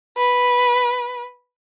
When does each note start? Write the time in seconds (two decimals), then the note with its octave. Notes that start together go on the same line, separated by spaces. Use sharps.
0.18 B4